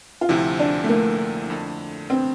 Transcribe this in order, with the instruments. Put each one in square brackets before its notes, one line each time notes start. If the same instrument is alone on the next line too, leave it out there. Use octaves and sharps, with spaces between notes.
[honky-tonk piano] F4
[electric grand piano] D2 C3 F3 [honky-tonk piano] E4
[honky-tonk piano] D4
A3
A#3
[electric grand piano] F2 D3 A3
[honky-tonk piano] C4